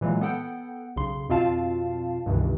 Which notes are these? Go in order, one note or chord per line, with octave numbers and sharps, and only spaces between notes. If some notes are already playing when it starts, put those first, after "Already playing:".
A#2 E3 F#3 G#3 A#3
B3 A4 F#5 G5
B1 C#3 C6
F2 B2 C4 F4 F5 A5
C#2 G2 C3 D#3 E3